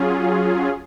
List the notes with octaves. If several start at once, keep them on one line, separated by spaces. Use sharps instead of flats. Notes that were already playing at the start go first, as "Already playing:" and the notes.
Already playing: F#3 C#4 F4 G#4